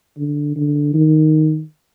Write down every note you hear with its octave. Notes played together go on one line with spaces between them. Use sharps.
D3
D3
D#3